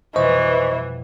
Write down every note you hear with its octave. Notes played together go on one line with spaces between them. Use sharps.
F2 B2 E3 G3 C5 D#5 C#6